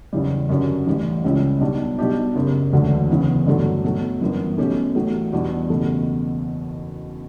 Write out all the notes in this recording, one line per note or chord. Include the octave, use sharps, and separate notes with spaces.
F#1 E2 C#3 E3 G3
F#2 D3 F#3 C#4
A1 A2 E3 G3
C#2 C#3 G3 C#4 E4
B1 B2 G3 D4 F#4
B1 B2 G3 D4 G4
F#1 F#2 C#3
E1 D2 D3 F#3
F#1 E2 C#3 E3 B3
G2 D3 F#3 A3
B2 F#3 A3
G1 F#2 E3 B3
B2 A3 C#4 G4
A1 A2 F#3 A3
E2 B2 G3 D4 F#4
F#1 E2 B2 A3